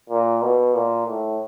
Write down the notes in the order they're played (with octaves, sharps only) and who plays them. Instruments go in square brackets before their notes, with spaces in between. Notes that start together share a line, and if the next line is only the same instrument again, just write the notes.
[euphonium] A#2
B2
A#2
A2